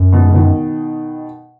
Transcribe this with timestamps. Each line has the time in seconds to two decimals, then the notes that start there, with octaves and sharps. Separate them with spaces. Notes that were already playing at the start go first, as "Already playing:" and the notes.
Already playing: F#2
0.13 G#2 B2
0.29 C#3
0.34 B2 D#3